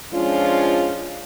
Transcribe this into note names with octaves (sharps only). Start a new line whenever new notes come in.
F3 G#3 C#4 D4 F4